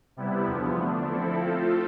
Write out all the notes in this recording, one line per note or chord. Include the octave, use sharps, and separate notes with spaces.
C3 G3 B3 E4
E2 D3 F3 B3
D3 A3 D4
F3 C4 E4 A4
F3 A3 C4 F4 A4